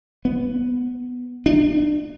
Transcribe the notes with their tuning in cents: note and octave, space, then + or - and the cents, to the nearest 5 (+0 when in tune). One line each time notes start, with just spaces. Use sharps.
B3 +5
D4 +30